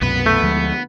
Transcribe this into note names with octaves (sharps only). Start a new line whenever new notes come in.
C2 F#2 B2 B3 B4
A3
D2 F3 G#3